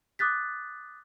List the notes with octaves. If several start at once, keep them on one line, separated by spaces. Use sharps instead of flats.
D6 D#6 F#6 A6 B6